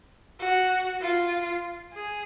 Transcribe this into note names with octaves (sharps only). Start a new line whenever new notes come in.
F#4
F4
G#4